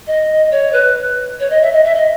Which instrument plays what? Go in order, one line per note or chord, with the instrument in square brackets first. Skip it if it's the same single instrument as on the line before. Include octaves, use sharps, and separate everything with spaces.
[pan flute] D#5
C#5
B4
C#5
D#5
E5
D#5
E5
D#5